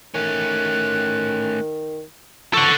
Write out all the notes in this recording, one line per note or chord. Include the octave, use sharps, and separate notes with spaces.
D#3 A3 C#4 F#6
F3 B3 A4 F#5 C#6